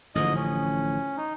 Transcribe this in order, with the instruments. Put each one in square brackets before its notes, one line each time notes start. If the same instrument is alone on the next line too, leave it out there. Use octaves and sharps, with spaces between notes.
[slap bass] A1 D3 F3 [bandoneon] G#2 D#5 D#6
[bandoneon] C#4
D#4